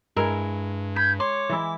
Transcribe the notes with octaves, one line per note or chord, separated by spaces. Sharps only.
G2 G#3 E4 A#4 E5
B5 G6 G#6
C#5 C6 D6
E3 G#3 E4